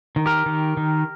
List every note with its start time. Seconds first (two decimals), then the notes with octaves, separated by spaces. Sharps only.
0.16 D#3
0.26 G4 A#4
0.46 D#3
0.77 D#3